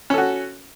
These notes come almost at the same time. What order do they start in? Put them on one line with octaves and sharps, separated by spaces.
C#4 A4 F#4